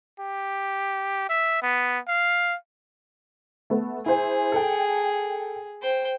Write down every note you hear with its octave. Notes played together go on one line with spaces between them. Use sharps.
G4
E5
B3
F5
A3 B3
E4 G#4 C5 G#5
A4 G5
C5 G5